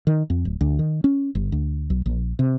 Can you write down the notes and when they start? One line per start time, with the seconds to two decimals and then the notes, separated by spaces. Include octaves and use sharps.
0.07 D#3
0.30 F2
0.45 D1
0.61 D2
0.79 D#3
1.04 C#4
1.35 G1
1.52 D2
1.90 B1
2.06 A#1
2.39 C3